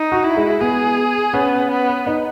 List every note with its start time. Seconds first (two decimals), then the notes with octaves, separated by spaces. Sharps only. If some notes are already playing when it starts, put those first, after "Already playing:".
Already playing: D#4
0.12 F#4
0.24 E4
0.37 G#3
0.61 B3 G#4
1.34 B3 C#4
1.71 B3
2.07 D#4